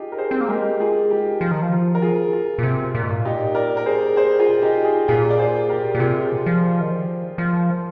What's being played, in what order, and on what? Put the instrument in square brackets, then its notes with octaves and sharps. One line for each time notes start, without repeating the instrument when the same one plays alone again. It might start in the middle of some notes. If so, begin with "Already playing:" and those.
Already playing: [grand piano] D#4 F4 G4 G#4
A#4
G#4 C5
[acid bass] C4
A#3
[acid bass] G#3 [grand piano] G4 A#4
[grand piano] F4 G#4
D#4 G4
[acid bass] F3
D#3
F3
[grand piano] F4
A#4
F4 G#4
F4
[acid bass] A#2
C3
A#2
G#2
A#2
[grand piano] D#4 G4
A#4 D5
A#4
G#4 C5
G#4 C5
F4 G#4
D#4 G4
F4 G#4
[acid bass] A#2 [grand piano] F4 G#4
[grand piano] D5
G#4 C5
G4 A#4
[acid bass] A#2
[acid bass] C3 [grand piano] F4 G#4
[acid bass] F3
D#3
F3
F3